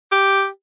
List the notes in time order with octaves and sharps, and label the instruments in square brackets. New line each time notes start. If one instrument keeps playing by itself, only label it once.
[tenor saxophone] G4